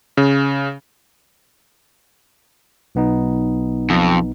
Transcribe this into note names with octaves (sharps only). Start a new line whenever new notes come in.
C#3
B1 B3 D#4
F2